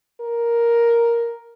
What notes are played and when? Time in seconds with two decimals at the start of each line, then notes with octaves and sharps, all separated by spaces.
0.21 A#4